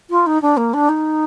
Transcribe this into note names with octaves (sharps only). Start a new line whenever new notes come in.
F4
D#4
D4
A#3
D4
D#4